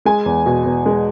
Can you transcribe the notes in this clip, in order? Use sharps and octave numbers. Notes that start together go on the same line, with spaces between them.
G#3 G#5
E2
B2
E2
G#3